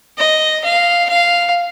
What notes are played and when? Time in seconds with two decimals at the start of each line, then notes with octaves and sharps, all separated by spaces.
0.18 D#5
0.64 F5
1.09 F5